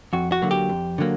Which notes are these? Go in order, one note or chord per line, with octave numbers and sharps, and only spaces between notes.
F2 F#4
F#4
D3 F#3 A#3
G4
F2
D3 F#3 A#3